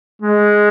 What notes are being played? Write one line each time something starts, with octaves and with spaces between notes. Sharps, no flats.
G#3